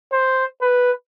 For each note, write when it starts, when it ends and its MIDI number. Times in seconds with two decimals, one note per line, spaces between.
0.12 0.45 72
0.62 0.92 71